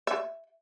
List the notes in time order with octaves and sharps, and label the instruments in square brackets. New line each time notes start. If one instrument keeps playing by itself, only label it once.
[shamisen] E5